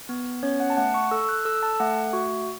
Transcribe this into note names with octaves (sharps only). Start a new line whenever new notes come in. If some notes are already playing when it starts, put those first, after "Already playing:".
B3
C#4 C#5
F#5
A5
A3 F#5
C#6
A4 E6
E6
F#6
A4 E6
A5
A3 F#5
F#4